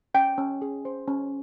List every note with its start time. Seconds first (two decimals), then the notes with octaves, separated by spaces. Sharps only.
0.14 C#4 G5
0.38 C#4
0.62 G#4
0.85 C5
1.08 C#4